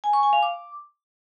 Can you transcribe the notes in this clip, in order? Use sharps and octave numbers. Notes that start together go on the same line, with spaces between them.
G#5
C#6
G#5
F5
D6